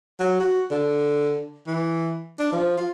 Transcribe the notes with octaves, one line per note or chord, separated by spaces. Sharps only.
F#3
F#4
D3
E3
D4
F3
F4